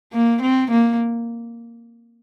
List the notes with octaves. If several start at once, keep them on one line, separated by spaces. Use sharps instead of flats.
A#3
C4
A#3